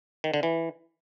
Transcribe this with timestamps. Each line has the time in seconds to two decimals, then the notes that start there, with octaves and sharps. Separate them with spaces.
0.24 D#3
0.34 D3
0.43 E3